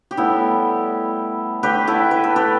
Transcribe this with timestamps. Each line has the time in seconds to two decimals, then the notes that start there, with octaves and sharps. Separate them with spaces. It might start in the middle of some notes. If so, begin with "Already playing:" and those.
0.11 G4
0.17 A2 G3 B3 E4 A4
1.63 D3 A3 G4 B4
1.88 E4 A4
2.11 B4
2.24 A4
2.36 G4 B4